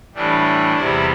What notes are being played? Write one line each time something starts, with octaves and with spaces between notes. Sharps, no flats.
A2 E3 G3 D4
E2 C3 G3 E4